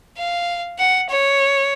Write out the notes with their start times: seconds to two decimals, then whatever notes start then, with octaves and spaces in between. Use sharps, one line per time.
0.17 F5
0.79 F#5
1.10 C#5